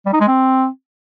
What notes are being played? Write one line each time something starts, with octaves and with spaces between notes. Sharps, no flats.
G3
D#4
G#3
C4